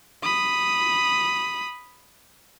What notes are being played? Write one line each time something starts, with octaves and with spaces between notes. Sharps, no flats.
B5 D#6